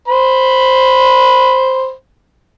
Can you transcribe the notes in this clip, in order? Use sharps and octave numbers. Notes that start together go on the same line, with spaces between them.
C5 B5